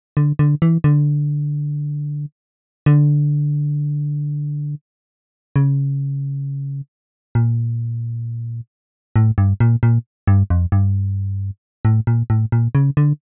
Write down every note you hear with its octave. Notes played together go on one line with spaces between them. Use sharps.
D3
D3
E3
D3
D3
C#3
A#2
A2
G2
A#2
A#2
G2
F2
G2
A2
A#2
A2
A#2
C#3
D3